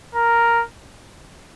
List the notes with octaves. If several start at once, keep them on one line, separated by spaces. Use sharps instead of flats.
A#4